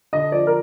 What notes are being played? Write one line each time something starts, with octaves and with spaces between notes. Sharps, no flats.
D3 D#5
F3 D5
A#4